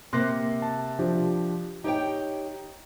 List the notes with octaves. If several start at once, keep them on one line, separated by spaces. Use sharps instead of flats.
C3 A#3 C6 F#6 A#6
A5
F3 D4 G4
D#4 G4 C#5 G5